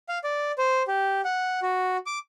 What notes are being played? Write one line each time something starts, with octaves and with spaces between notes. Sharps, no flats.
F5
D5
C5
G4
F#5
F#4
D6